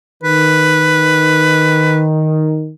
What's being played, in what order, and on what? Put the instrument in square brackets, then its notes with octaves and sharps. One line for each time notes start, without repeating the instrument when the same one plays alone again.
[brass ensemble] D#3 [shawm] B4